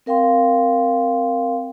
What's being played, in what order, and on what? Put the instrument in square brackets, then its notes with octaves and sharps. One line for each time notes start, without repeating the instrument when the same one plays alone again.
[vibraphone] C4 A#4 F5 G5 C6